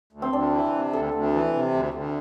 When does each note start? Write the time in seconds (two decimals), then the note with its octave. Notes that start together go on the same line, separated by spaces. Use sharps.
0.13 D2
0.22 C4
0.33 D2 D4
0.53 E3
0.73 C3
0.93 D2 A4
1.14 D2
1.33 E3
1.53 C3
1.73 D2
1.94 D2